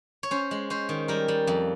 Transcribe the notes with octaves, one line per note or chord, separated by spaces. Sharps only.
C#5
C#4 C5
G#3
C#4 C5
D#3
G3 A#4
G3
F2